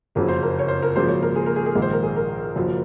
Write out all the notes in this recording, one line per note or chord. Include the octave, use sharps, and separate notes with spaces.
F#1 F2 C#3 F#3 A#4
C5
A#4
C#5
C5
A#4
G#1 F#2 C#3 F3 A#3 C5
C#5
A#4
G#4
A#4
G#4
G#4
A#1 G#2 D#3 G#3
C5
A#4
G#4
A#4
F#1 F#2 F3